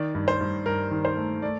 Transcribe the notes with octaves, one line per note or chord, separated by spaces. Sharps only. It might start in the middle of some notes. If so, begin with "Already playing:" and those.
Already playing: D#3 D5
G2
C5
G2
G2 A#4
D#3
C5
A3
A3 D5